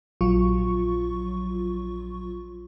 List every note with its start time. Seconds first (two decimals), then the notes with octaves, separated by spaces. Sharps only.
0.21 A#1 F#3 F4 C#6